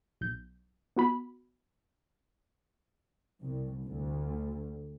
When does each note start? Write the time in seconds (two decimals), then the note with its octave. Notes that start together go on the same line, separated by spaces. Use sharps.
0.21 B1 G6
0.96 B3 F#4 B5
3.41 C2
3.83 D2